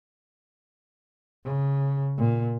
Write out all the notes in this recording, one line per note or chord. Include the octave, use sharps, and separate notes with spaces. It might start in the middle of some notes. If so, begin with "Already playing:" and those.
C#3
A#2